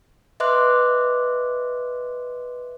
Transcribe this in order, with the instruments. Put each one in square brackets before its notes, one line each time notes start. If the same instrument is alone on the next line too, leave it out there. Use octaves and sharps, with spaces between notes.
[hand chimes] B4 D#5 E5 C6 D6 F#6